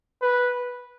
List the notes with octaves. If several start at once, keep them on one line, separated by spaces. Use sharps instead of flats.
B4